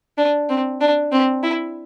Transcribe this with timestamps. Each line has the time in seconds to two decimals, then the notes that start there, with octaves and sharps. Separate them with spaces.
0.18 D4
0.49 C4
0.81 D4
1.12 C4
1.43 E4